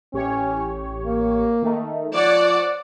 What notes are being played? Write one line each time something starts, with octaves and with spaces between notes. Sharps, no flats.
A1 C#4 G4 C#5
A#3
D#3 A3 D#4
F3 C#5 D5 F#5 E7